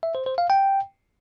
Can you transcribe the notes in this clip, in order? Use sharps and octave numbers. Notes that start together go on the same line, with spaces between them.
E5
C5
C5
F5
G5